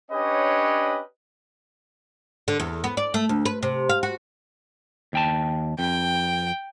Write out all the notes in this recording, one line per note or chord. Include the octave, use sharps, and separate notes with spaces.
C#4 D4 G4 B4 C#5 D#5
D3
E2
B3
D5
A3
D2
B4
C3
F5
F#4
D#2 G5 A5
F2 G5